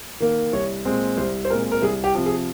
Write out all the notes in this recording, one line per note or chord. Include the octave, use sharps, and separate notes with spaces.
D#3 A#3
C2 C#5
A#2 G#3 C4
C2 C5
C5
A#2 G#3 C4 A#4
A#4
C2 G#4
G4
C3 F3
G#4